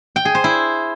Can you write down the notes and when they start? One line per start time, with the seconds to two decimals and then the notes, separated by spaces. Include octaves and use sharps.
0.16 G5
0.25 G#4
0.35 C5
0.44 E4